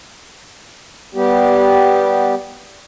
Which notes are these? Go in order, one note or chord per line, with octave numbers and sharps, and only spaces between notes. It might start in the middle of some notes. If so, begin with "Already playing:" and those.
G3 B3 G4